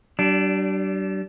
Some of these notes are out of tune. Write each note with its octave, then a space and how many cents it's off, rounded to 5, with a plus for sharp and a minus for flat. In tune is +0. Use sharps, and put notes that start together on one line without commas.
G3 -40 D4 +0